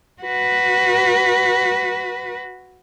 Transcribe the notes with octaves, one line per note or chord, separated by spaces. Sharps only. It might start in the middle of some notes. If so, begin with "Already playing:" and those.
F#4 B4